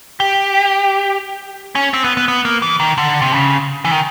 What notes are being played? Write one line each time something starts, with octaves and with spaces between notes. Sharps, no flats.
G4
C#4
C4
B3
B3
B3
A#3
E3
D#3
D3
C3
C#3
E3
D#3